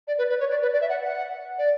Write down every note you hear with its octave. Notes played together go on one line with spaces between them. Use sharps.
D5
B4
B4
C#5
D5
B4
D5
E5
F#5
F#5
D5